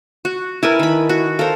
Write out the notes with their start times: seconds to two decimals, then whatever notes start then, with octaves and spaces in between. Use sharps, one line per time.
0.25 F#4
0.63 E4 A#4 B4 G#5 A5
0.79 D#3 B5
1.09 F#4
1.39 A4 A#4 C5 F5